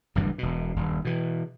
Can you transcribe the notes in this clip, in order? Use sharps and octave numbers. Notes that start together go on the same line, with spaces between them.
F#1 D2 G2 E3
E1 B2
D#1 G2
B2 E3